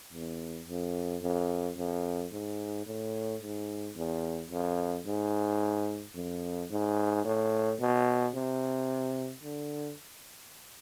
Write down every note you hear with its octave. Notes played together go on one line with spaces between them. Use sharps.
E2
F2
F2
F2
G#2
A2
G#2
E2
F2
G#2
F2
G#2
A2
B2
C3
D3